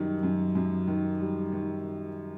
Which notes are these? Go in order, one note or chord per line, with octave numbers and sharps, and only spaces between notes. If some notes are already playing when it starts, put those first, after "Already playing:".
Already playing: F#2 D#3 G3
F#2
F#2
D#3
G3
D#3